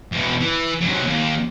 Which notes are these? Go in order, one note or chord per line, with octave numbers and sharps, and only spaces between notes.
E2 B2
E3
G#2 F#3
D#2